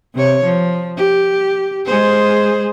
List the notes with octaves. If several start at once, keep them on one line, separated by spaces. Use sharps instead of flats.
C3 C#5
F3
G4
G#3 G#4 C5